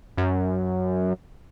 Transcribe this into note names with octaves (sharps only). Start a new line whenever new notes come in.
F#2